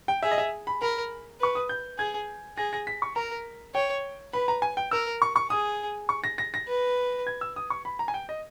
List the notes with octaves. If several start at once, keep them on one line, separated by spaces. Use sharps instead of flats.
G5
G#4 E5
D#5
E5
B5
A#4 B5
B4 C#6
D#6
G6
G#4 G#6
G#4 A#6
A#6
B6
C#6
A#4 A#5
C#5 G5
B4 B5
A#5
G#5
G5
A#4 E6
C#6
C#6
G#4 D#6
C#6
A#6
A#6
A#6
B4
G#6
E6
D#6
C#6
B5
A#5
G#5
G5
D#5